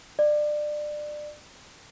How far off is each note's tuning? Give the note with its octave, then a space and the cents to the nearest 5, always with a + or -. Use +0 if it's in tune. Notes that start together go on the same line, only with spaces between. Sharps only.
D5 +25